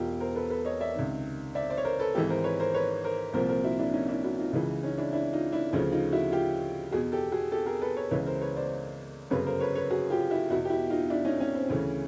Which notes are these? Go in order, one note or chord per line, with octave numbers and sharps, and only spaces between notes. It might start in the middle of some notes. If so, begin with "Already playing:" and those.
Already playing: E1 E2 B2 F4 G4
A#4 C5
A4 B4
A4 B4
C#5 D#5
D5 E5
C#2 C3 D#3
D5 E5
C5 D5
C#5
A#4 C5
A4 B4
G#1 G#2 E3 G4 A4
A#4 C5
B4 C#5
A#4 C5
B4 C#5
A#4 C5
C2 A#2 F3 A#4 C5
A#4 C5
E4 F#4
D4 E4
C#4 D#4
D4 E4
E4 F#4
D#4 F4
C#2 C#3 E3 D#4 F4
C#4 D#4
D4 E4
D4 E4
D#4 F4
D4 E4
D2 C#3 F3 C#4 D#4
D#4 F4
E4 F#4
F4 G4
E2 B2 F#4 G#4
G4 A4
F#4 G#4
G4 A4
G#4 A#4
A4 B4
B4 C#5
C#2 C#3 E3 B4 C#5
A#4 C5
B4 C#5
C5 D5
G1 F#2 C#3 B4 C#5
A#4 C5
B4 C#5
B4 C#5
F#4 G#4
F4 G4
E4 F#4
E2 B2 E4 F#4
G4
E4 F#4
D#4 F4
D4 E4
C#4 D#4
C#4
C4
D2 C#3 E3 C#4